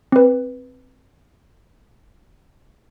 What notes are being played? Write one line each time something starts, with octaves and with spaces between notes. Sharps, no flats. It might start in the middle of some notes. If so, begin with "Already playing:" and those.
C4 B4